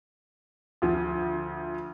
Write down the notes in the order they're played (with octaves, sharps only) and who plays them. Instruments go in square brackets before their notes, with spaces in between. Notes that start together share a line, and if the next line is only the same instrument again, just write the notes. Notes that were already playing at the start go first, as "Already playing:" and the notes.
[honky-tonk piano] D2 F3